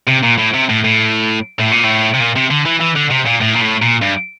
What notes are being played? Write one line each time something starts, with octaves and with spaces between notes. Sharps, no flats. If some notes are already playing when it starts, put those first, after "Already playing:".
C3
A#2
A2
C3
A2
A2
A2
A#2
A2
C3
A#2
C3
D3
E3
E3
D3
C3
A#2
A2
A#2
A2
A#2
G2